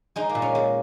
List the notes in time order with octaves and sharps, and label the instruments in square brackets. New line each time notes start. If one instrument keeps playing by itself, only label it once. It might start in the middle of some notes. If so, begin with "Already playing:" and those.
[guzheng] G#3 D#4 G#4
A#3
A#2
C#4
G#3